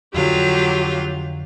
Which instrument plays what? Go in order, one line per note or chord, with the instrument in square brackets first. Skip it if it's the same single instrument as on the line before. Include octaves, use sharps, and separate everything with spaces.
[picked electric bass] F2 D3 [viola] F#3 G4 [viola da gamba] F4